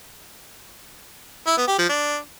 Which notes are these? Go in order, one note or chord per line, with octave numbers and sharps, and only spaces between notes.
E4
B3
G4
F3
D4